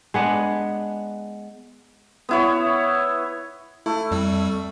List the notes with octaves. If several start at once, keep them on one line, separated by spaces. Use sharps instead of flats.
G#3 B3 D4
B3 E4 C#5
A3 E4
F2 G3 E6